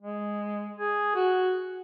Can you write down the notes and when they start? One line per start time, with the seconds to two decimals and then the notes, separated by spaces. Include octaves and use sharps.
0.01 G#3
0.76 G#4
1.15 F#4